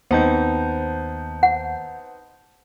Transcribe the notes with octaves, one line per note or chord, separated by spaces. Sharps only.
D#2 B3 C4 D#4 C5 A5 G6
F#5